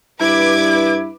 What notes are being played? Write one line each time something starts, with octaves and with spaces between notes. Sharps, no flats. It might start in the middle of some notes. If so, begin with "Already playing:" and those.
G2 E4 B4 D6 G#6